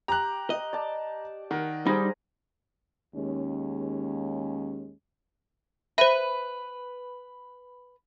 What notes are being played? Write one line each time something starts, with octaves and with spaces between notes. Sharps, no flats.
G4 A#5 F#6
D#5
D5 A5
D#3 A#4 F#5
G3 D#4 G#4 C5 A#5 B5
D#2 G#3 C#4
B4 C5 E5